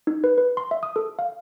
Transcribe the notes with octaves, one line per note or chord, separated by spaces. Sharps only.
D#4
B4
B4
C6
E5
D#6
A4
F5